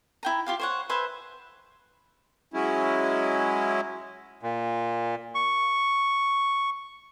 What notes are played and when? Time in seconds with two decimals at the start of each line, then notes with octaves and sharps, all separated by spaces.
0.23 E4 G5 A#5
0.46 F4 G4 F5
0.59 C5 C#5 F#5
0.89 B4 C5 E5 G#5
2.54 F#3 G#3 C#4 E4
4.43 A#2
5.35 C#6